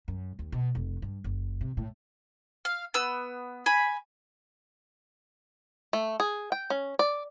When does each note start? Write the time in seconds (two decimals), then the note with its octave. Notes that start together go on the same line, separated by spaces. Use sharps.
0.08 F#2
0.39 D#2
0.52 B2
0.75 F1
1.02 G2
1.24 F#1
1.61 C3
1.77 A2
2.65 F5
2.94 B3 E6
3.66 G#5 B5
5.93 A3
6.20 G#4
6.52 G5
6.70 C#4
6.99 D5